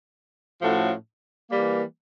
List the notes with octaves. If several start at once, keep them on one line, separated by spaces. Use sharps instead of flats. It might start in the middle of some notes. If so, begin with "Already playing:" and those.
A2 F3 A3 C#4 F#4
E3 G3 A#3